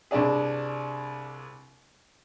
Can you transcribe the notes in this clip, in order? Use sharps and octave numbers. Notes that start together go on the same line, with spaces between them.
C2 G2 D4 G#4